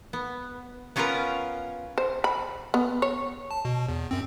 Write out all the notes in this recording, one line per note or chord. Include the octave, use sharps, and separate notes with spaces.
B3
B3 C#4 F4 A#4 B4 A#5
C5
B5
B3
C#5
A5
B2
E2
F#2 C4